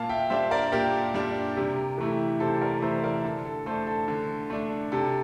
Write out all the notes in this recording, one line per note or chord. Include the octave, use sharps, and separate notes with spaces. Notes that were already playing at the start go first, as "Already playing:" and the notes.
Already playing: A#2 F5 A5
E5 G5
G3 D4 C5 E5
A#4 D5
A#2 G4 A#4
G3 D4
C3
E3 A3 E4
C3 A4 C5
A#4 D5
E3 A3 E4 C5 E5
A#4 D5
D3 A4
A4
A3 D4 A4 C5
A4
D3
A3 D4
C3 A4